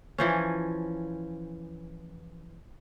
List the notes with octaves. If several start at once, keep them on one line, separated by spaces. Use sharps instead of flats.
E3 F3 C#4